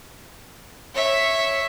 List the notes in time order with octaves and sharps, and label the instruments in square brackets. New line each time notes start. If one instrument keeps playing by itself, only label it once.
[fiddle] C#5 E5